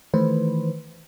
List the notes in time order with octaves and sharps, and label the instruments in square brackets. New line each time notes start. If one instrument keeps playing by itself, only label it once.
[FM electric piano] D#3 E3 A3 B4 C5